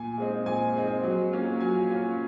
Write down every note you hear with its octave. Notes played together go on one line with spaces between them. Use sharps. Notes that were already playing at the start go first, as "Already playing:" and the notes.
Already playing: A#2 G#5
G#3 C4 D#4
A#2 G#5
G#3 C4 D#4
F#3
A#3 C#4 F4
F#3 G#5
A#3 C#4 F4